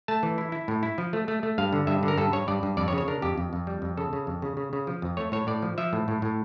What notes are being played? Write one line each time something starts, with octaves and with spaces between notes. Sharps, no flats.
A3 A5
E3
E4
E4
A2
E4
F3
A3
A3
A3
G2 F5
D3
G2 E5
D3
A#4
G2 A4
G2 C#5
G2 D5
G2
F2 D5
C#5
C#3
C#5
D4 A#4
F2 G4
F2
F2
G3
F2
C#3 A4
C#3
F2
C#3
C#3
C#3
F3
F2
A3 C#5
A2 C#5
A2 D5
F3
F3 E5
A2
A2
A2